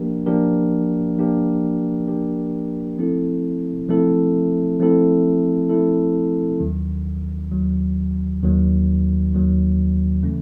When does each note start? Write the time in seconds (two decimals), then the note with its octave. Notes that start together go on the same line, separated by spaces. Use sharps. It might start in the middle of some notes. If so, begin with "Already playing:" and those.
Already playing: F3 A#3 D4 G4 A#4
0.26 F3 A#3 D4 G4 A#4
1.17 F3 A#3 D4 G4 A#4
2.07 F3 A#3 D4 G4 A#4
2.98 F3 A3 C4 E4 A4
3.89 F3 A3 C4 E4 A4
4.80 F3 A3 C4 E4 A4
5.69 F3 A3 C4 E4 A4
6.60 D#2 D#3 F#3
7.51 D#2 D#3 F#3
8.42 D#2 D#3 F#3
9.32 D#2 D#3 F#3
10.23 C#3 E3 A3 C#4